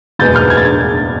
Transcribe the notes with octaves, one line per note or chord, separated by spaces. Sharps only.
F#1 E2 B2 G#3 B3 G6 A6
F6 G6
G#6
A6
G#6